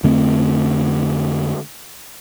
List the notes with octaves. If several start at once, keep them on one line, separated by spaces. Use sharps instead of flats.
F2 D3 A3 C4